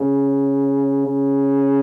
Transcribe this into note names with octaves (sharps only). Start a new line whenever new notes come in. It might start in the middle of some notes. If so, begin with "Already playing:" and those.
Already playing: C#3
C#3